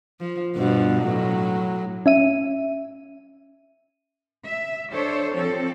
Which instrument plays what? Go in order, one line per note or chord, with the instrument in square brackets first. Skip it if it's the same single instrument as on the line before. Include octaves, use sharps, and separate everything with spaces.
[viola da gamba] F3
G2 B2 F3
A2 F#3
[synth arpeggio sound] C#4 E5 D#7
[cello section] E5
D4 A4 C5 C#5
F3 C4 A4